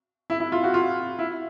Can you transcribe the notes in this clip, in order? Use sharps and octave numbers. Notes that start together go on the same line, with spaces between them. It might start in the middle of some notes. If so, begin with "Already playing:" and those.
E4
E4
F4
F#4
F4
E4